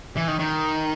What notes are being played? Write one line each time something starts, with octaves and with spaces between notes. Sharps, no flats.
E3
D#3
D#3